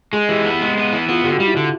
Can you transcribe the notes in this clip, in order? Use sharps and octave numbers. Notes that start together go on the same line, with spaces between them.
G#3 G#4
E3 G4
B3
G#3
B3
E3
B3 F4
D3 G4
F#4
G3
E4
D3 F4